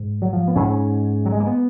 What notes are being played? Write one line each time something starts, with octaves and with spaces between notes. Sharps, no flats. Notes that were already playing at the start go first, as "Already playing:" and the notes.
Already playing: G#2
F#3
F3
B3
G#2 C#4
F#3
G#3
A#3
B3